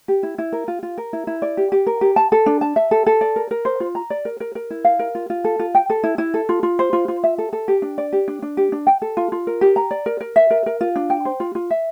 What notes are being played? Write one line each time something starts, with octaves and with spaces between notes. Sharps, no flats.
G4
E4
E4
A#4
F4
F4
A#4
E4
E4
D5
G4
G4
A#4
G4
A5
A4
D4
A5
E5
A4
A4
D5
A#4
A#4
C5
F4
A#5
D5
A#4
A#4
A#4
E4
F5
A#4
F4
F4
A4
F4
G5
A4
E4
E4
A4
F4
F4
C5
F4
F4
E5
A4
A4
G4
D4
D5
G4
D4
D4
G4
D4
G5
A4
F4
F4
A#4
G4
A#5
D5
A#4
A#4
E5
A#4
A#4
F4
D4
G5
C5
F4
F4
E5